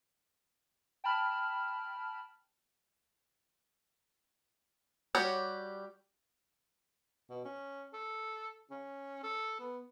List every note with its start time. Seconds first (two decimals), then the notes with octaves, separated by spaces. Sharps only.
1.04 G5 A5 B5 F6
5.15 G3 F#4 G4 C#5
7.30 B2
7.45 C#4
7.93 A4
8.70 C#4
9.23 A4
9.60 B3